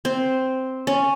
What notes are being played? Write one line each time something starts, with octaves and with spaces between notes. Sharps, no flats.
C4
C#4